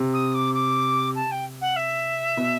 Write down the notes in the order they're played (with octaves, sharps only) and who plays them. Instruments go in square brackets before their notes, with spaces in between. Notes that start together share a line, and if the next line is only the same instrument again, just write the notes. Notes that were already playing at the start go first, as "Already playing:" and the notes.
Already playing: [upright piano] C3
[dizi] D#6
D6
D6
A5
G5
F#5
E5
[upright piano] B2